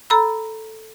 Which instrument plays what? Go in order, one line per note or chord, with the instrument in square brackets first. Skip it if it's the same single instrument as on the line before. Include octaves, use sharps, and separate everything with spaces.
[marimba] A4 A#5 B5 E6